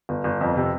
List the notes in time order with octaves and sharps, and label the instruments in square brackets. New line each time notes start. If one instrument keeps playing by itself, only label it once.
[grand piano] G1
G1
F2
C3